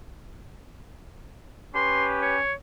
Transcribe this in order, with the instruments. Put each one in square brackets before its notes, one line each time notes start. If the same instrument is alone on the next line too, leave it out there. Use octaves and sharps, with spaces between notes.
[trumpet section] C#4 G4 B4 [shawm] C6
[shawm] C#5